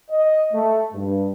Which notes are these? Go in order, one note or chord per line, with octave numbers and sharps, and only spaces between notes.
D#5
A3
G2